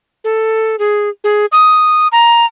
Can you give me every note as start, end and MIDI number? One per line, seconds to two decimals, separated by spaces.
0.24 0.76 69
0.79 1.09 68
1.24 1.46 68
1.52 2.08 87
2.12 2.46 82